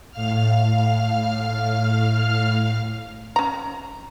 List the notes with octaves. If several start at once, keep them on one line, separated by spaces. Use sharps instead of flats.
A2 F5 F6
C#4 A#5